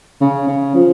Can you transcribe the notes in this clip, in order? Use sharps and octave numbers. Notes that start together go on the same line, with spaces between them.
C#3
C#3
F3